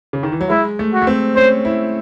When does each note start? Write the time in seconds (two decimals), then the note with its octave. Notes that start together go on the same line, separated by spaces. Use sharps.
0.13 C#3
0.23 D#3
0.32 E3
0.41 F#3
0.50 G#3 E4
0.79 A3
0.93 F#4
1.02 A3
1.07 C4
1.36 C#4 C5
1.65 E4